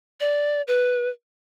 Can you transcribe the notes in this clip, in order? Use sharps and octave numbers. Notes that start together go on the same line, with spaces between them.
D5
B4